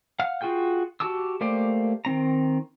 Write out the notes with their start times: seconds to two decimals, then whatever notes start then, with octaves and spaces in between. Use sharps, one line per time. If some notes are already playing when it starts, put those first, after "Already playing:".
0.19 F5 F#5 F6
0.41 F4 F#4 G#4 G5 G6
1.00 F#4 G4 A5 D6 E6
1.41 A3 A#3 G4 C5 D5
2.05 D#3 C4 A#5